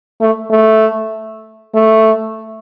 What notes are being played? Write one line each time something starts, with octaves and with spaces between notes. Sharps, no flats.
A3
A3
A3